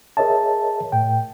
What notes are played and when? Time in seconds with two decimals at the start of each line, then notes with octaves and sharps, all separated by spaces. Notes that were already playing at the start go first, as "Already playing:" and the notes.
0.17 G#4 A#4 C#5 D#5 E5 A5
0.92 A2 G5